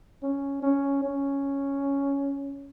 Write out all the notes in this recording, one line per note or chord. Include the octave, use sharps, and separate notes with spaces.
C#4
C#4
C#4